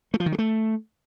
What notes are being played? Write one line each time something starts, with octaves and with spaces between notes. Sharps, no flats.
A3
F3
D#3
F#3
A3